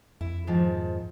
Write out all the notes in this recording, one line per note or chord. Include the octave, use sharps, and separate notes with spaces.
F2 E4
G#2 D#3 F3